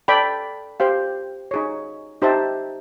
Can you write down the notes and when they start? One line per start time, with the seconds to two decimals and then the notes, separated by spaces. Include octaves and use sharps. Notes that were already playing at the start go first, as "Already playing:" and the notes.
0.08 A4 D5 G5 B5
0.80 G4 C5 F5
1.51 D#4 G#4 C#5
2.22 D#4 G4 C5 E5 A5